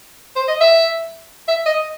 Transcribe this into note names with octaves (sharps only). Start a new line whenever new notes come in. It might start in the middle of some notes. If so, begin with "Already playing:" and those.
C5
D#5
E5
E5
D#5